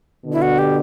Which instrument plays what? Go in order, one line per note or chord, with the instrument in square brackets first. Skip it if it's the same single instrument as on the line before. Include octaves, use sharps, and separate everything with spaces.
[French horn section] B2 D3
[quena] E4
F#4
G4